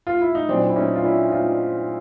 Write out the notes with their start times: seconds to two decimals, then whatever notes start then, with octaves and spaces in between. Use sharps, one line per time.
0.07 F4
0.21 E4
0.35 D#4
0.49 A#2 F#3 C4 D4
0.69 E4
0.76 C#4 D#4
0.95 F4
1.04 D4 E4
1.32 D#4 F4